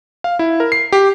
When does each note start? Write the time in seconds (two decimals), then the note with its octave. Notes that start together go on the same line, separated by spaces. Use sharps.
0.24 F5
0.39 E4
0.60 A#4
0.72 C7
0.92 G4